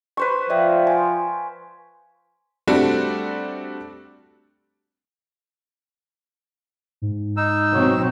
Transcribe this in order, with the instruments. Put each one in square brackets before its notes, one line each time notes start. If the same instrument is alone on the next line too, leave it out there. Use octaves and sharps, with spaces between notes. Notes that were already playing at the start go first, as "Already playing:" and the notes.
[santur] B4 C5 C#6
[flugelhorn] F3 [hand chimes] D5 E5 G5
[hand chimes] G#5
[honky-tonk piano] G3 A3 C4 D4 F#4 A4
[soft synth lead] G#2
[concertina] D#4 E6
[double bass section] B2 F#3 C4